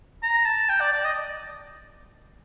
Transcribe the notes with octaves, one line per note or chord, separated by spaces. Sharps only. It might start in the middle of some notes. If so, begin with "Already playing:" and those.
A#5
A5
G5
D5
D5
D#5